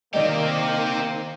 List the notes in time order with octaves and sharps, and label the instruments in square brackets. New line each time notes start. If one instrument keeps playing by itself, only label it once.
[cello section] D#3 [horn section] A#3 [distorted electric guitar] C4 G4 [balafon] D5 D#5